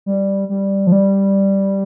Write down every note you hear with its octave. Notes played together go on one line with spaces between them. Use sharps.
G3
G3
F3
G3